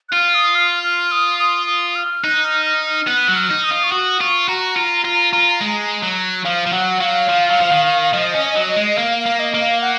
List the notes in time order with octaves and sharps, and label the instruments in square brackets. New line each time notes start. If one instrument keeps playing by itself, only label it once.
[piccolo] F#6
[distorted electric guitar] F4 [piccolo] F6
[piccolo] D#6
F6
F6
D#6
D#6
D#6
F6
[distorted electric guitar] D#4 [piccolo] F#6
[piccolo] F6
F6
F6
[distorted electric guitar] B3 [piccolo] F#6
[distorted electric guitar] F#3
[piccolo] F6
[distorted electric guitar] D#4
[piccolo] D#6
[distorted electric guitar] F4
[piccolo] C#6
[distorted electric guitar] F#4 [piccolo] D#6
[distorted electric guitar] F4 [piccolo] C#6
[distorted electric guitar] F#4 [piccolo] A#5
[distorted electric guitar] F4
F4
F4
G#3
F#3
[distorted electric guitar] F3 [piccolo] F5
[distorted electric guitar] F3
[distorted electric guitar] F#3 [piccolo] F#5
[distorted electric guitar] F#3 [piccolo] F5
[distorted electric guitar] F3
F#3
F3
D#3
[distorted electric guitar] F3 [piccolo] D#5
[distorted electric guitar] C#4
F#3
G#3
[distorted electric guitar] A#3 [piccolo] F5
[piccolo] F5
[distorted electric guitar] A#3
[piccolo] D#5
[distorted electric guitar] A#3
[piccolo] F5
F#5